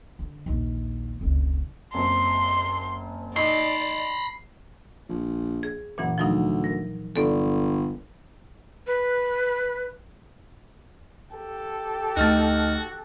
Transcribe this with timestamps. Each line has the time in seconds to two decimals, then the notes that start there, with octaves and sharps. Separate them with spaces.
0.19 D3
0.46 A#1 D#2
1.21 F1 C#2
1.94 F#1 C4 C6
3.36 D#4 D5 B5 C6 C7
5.09 A#1
5.63 G#4
5.98 F#1 A#2 E3 F#5
6.18 D2 F3 F#3 D#4
6.64 A#4
7.16 G1 A4 D5
8.87 B4
11.36 G4 A4
12.17 D2 A3 D#4 F#4 F6 A6